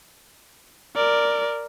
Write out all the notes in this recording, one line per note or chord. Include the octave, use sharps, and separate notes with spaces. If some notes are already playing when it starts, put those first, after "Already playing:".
A#4 D5